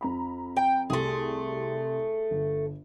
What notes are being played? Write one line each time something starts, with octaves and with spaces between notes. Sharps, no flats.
F2 A#5 B5
G5
C2 A3 G4 G#4 C6
G1